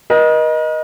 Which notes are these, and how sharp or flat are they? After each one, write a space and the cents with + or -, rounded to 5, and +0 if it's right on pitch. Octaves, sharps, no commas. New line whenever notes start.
A#4 +45 D#5 +0